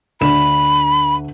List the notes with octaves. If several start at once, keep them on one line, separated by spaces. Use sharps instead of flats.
D2 D4 B5 E7